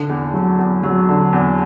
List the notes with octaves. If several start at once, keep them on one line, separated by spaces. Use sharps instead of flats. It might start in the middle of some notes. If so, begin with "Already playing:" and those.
Already playing: D3
E2
F#3
E2
F#3
D3
E2